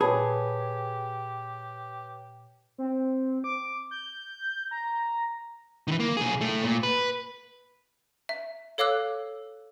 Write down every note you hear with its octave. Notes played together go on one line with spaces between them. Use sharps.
A#2 G4 G#4 B4 C#5 A5 B5
C4
D6
G6
A#5
D#3 E3
A#3
B1 G#4
A2 A3
A#2
B4
E5
A4 C#5 F5 D6 E6 F#6